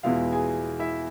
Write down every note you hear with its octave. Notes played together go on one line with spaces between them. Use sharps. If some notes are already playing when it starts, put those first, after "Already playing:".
E2 B2 G#3 B3 E4 F4 F5
G#4 G#5
E4 E5